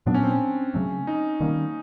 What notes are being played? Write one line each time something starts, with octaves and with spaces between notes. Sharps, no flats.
A#2 F#3 B3 D4
C#4
C4
C#4
C#3 F#3 A3
D#4
D#3 G3 A#3 C#4